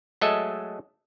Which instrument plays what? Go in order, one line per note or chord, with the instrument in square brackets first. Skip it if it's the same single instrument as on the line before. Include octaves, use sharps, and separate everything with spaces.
[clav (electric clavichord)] F#3 G#3 A3 A4 D#5 E5